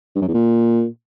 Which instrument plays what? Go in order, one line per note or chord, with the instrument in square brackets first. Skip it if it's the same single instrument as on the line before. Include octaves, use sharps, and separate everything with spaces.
[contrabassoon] G2
F#2
E2
A#2